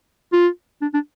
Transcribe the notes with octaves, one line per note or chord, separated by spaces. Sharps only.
F4
D4
D4